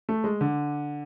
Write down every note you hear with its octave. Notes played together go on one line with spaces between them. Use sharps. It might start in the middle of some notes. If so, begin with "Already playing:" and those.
A3
G#3
D3